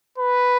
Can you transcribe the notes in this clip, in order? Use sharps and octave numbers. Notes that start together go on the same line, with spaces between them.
B4